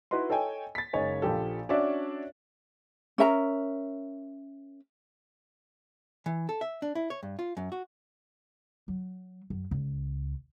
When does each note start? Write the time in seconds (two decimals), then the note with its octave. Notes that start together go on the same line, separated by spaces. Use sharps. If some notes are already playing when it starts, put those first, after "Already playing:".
0.11 D#4 E4 F#4 B4 D#5 C6
0.30 A4 C#5 D#5 G5 G#5
0.75 A6 B6
0.93 F#1 G#3 D#4 C#5 D#5 G#5
1.22 A#1 F3 G4 A4
1.69 C#4 D4 F#4 C#5 D5 E5
3.18 C#4 A#4 E5 A#5
6.26 E3
6.49 A4
6.61 E5
6.82 D4
6.95 E4
7.10 C#5
7.23 G2
7.39 F4
7.57 F#2
7.72 F#4
8.88 F#3
9.50 F#2
9.71 C#2